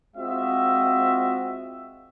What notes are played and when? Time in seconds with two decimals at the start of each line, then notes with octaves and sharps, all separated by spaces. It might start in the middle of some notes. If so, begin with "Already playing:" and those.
0.16 G#3 C4 F4 F#4 D#5 E5